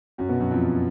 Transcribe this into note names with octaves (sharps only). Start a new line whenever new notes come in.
F#2 F#3
B2 B3
F#2 F#3
F2 F3